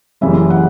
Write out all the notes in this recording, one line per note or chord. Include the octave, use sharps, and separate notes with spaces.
F#1 F#2 C#3 E3 G3 E5
F#5